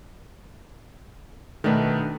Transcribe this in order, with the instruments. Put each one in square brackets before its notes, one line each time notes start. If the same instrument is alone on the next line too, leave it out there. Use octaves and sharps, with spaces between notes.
[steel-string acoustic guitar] B2 A3 [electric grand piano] D#3 D4 B4